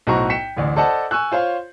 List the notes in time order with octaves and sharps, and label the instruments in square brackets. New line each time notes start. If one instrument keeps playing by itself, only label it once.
[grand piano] B1 A2 F#4 C5 A#5 C#6
G5 B6 C#7 E7
A1 D2 D5
A4 C5 D5 D#5 F#5 A5
G#5 C#6 E6 F#6
F4 C5 C#5 F5